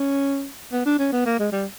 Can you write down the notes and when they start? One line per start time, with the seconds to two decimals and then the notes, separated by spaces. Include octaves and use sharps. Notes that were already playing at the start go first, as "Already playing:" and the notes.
Already playing: C#4
0.72 B3
0.86 D4
0.99 C#4
1.12 B3
1.26 A#3
1.39 G#3
1.52 G3